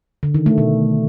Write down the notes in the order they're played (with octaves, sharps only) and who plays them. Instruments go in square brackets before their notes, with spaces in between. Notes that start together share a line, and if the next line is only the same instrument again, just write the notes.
[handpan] D3
D#3
A3
B2